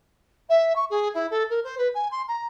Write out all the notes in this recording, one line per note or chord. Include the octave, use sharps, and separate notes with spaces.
E5
C#6
G#4
E4
A4
A#4
C5
B4
G#5
C6
A#5